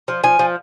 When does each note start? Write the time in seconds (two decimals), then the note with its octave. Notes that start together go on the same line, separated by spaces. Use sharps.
0.08 F3
0.24 F3 G#5
0.39 F3